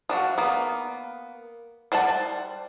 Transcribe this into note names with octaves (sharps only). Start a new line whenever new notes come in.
F3 D4 F#4
A#3 B3
G3 C5 F#5 A5